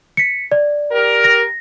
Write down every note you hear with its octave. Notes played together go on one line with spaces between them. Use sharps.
B6 C#7
D5
G4 A#4
A#6